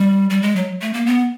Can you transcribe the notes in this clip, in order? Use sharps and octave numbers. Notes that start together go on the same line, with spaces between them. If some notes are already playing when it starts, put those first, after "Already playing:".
Already playing: G3
G3
G#3
F#3
A3
A#3
B3